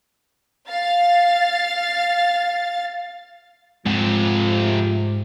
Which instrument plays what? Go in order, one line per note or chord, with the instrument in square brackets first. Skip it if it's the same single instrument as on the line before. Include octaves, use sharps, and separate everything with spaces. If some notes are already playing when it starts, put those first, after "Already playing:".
[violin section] F5 A6
[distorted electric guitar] F2 C3 [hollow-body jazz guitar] G#2 G#3 F#5 [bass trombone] F3